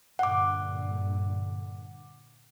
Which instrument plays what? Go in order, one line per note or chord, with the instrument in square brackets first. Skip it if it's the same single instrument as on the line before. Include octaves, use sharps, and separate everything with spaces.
[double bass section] G2 A#2 D3 [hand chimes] F#5 D6